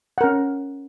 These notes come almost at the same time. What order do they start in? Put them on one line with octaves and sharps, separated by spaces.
F#5 A#4 C#4